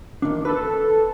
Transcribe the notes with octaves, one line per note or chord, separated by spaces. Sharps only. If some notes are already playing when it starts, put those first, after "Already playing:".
D#3 D4
A4 B4